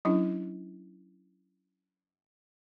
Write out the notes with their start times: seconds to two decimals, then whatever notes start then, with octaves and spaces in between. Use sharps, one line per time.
0.05 F#3 C#4 D4 E4